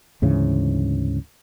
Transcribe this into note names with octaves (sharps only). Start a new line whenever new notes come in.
D2 G#2 C#3 E3